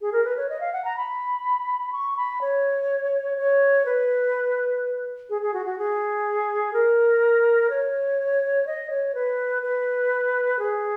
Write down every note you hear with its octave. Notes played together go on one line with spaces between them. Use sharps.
G#4
A#4
B4
C#5
D#5
F5
F#5
A#5
B5
C#6
B5
C#5
C#5
B4
G#4
G#4
F#4
F#4
G#4
A#4
C#5
D#5
C#5
B4
B4
G#4